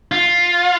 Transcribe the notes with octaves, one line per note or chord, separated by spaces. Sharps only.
F4